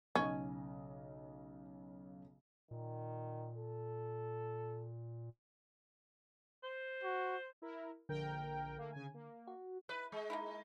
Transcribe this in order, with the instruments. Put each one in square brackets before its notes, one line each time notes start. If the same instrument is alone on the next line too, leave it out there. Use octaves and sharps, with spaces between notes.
[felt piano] B1 C#3 D#5 [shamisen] C#4
[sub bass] A#2 [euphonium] D#3
[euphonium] A4
[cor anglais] C5
[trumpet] F#4
[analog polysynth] E4 A#4
[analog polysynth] A#1 A#4 G5 [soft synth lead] D3
[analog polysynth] A3 A#3
C#3 G#5
A#3
[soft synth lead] F#4
[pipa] E4 [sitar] B4
[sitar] G#3
[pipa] A#3 D#4 E4